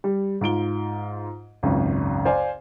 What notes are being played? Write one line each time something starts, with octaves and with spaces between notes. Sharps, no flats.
G3
G#2 F4 D7 G7
G#1 C#2 F#2
C5 D5 F5 G#5